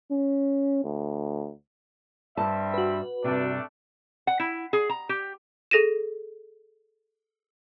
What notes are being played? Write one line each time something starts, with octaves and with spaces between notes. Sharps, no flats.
C#4
D2
G2 G3 C4 E5 A5
F#4 B4
G2 C3 A3 D4
F#5
E4
G#4
A#5
G4
G#4 A4 A#6 D#7 E7